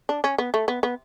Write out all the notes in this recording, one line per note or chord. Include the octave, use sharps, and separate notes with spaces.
D4
C#4
B3
A3
B3
B3